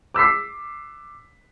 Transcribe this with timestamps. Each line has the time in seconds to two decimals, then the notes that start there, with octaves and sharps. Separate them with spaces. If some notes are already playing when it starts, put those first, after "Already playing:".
0.14 D6 E6 B6 C7